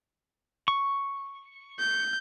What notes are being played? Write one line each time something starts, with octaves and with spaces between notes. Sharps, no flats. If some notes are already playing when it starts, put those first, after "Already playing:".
C#6
G6